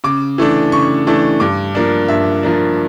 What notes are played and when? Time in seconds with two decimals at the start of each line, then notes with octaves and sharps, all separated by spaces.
0.04 C#3 D6
0.38 E3 A3 D4
0.72 C#3 C#6
1.07 E3 A3 D4
1.40 G2 D6
1.75 F3 A#3 D4
2.08 G2 E5
2.43 F3 A#3 D4